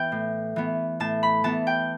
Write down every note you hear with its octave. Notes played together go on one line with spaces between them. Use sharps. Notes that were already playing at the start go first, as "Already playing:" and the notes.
Already playing: E3 B3 E5 G5
A2
E3 B3
A2 A5
B5
E3 B3 A5
G5